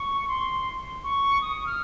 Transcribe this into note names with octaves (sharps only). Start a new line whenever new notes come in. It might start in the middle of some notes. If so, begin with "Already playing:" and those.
Already playing: C#6
C6
C#6
D#6
F6